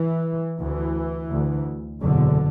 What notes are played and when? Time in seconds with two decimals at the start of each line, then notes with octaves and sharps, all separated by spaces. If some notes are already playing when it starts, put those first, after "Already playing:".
Already playing: E3
0.60 D2 E3
1.31 D2
2.02 F#1 E2 B2 D3